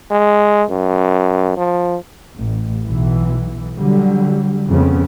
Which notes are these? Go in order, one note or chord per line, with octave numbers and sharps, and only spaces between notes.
G#3
F#2
F3
A1
B1 E3
D3 F#3 G3
F2 C#3 B3